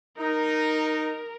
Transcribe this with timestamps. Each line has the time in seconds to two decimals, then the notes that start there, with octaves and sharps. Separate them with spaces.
0.18 D#4 A#4